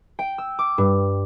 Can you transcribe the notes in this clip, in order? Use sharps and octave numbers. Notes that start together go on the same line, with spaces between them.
G5
E6
D6
G2